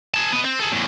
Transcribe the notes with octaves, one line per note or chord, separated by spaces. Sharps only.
G#4 A5
B3 D#5
C4
G#4 A4
E2 A2